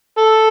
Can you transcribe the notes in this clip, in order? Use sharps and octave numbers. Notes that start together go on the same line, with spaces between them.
A4